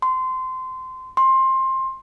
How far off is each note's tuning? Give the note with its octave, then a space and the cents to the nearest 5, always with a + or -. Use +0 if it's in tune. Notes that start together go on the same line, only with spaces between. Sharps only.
C6 -20
C6 +20